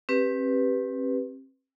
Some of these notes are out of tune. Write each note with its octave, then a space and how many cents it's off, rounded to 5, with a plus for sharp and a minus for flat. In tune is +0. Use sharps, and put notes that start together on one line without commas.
C4 +40 G4 +0 B4 +0